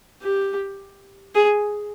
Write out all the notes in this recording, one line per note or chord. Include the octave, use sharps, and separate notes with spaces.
G4
G#4